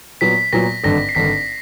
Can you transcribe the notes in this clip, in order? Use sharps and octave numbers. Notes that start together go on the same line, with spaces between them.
A#2 F#3 B3 B6
A#2 F#3 B3 A#6
G#1 G2 D3 A#6
C7
G#1 G2 D3 B6